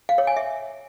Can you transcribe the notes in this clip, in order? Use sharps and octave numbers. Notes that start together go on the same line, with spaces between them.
F5
C#5
G#5
E5